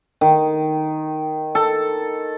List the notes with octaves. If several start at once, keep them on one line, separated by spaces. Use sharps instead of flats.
D#3
A4